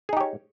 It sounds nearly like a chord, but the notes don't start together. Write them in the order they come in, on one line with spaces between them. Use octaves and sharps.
G#4 D#4 G4 C#5